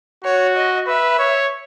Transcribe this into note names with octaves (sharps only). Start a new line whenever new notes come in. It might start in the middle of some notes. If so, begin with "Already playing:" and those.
F#4 C#5
D#5
B4 E5
C#5